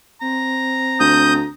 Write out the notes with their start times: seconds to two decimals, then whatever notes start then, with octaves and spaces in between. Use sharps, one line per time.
0.21 C4 A#5
1.00 D2 D#6 G6